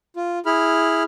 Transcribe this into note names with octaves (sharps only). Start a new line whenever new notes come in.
F4
E4 G#4 B5 F6